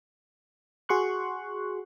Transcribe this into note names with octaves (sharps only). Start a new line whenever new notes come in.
F#4 G#4 C6 C#6 F#6